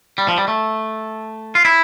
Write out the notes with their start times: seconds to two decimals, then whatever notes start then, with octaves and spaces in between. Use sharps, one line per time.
0.18 G3
0.28 F3
0.38 G3
0.48 A3
1.55 F4
1.65 E4